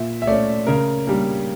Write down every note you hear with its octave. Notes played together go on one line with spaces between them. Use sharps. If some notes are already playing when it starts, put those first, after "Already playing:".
Already playing: A#2 E5
E5
A3 C#4 D5
C#3 A#4
G3 A#3 D4